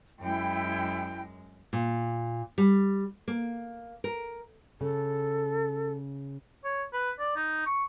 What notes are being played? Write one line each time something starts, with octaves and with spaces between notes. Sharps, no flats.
F#2 G#3 E4 G5
A#2
G3
A#3
A#4
C#3 A4
C#5
B4
D5
D#4
C#6